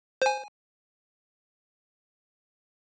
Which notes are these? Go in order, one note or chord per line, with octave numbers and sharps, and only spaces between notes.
C5 G#5